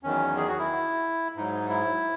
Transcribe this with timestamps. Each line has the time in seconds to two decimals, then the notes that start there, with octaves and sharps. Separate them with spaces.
0.03 E2 D#3 F#3 C#4
0.37 G#4
0.48 F#4
0.58 E4
1.36 G#2 F#3 D#4
1.69 E4